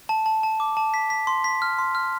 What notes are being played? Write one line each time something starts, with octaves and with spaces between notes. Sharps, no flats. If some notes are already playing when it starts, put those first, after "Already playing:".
A5
A5
A5
D6
A5
B6
B6
C6
B6
F6
C6
F6